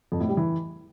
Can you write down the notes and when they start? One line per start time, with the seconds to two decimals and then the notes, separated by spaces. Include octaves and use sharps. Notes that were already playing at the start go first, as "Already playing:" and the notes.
0.12 F2
0.20 A2
0.29 G3
0.37 E3